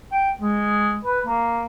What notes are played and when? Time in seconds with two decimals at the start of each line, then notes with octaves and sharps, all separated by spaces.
0.12 G5
0.41 G#3
1.05 B4
1.25 A#3